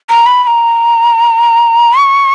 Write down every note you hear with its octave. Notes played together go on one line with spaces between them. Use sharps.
A#5
B5
B5
A#5
C#6